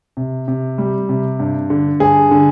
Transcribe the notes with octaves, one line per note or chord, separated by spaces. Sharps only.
C3
C3
G3
C3
G2
D3
G2 G#4
D3